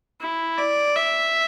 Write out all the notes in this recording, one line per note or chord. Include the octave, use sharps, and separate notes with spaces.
E4
D5
E5